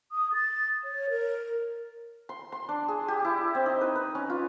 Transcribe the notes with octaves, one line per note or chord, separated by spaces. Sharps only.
D#6
A6
C#5
A#4
C6
C6
D4
G#4
G4
E4
C4
D#4
B4
B4
C#4
F4